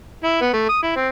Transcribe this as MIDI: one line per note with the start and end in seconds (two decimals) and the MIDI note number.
0.24 0.38 64
0.41 0.49 59
0.53 0.67 57
0.69 0.79 87
0.83 0.92 64
0.96 1.09 60